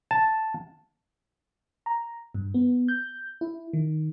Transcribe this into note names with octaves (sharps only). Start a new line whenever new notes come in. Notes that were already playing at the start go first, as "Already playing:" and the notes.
A5
A#5
G2
B3
G6
E4
D#3